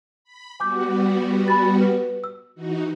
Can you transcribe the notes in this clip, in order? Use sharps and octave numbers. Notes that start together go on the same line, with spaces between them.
B5
G3 B3 F#4 G#5 D6 G6
G#5 B5 A6
B4
E6
E3 D#4 F#4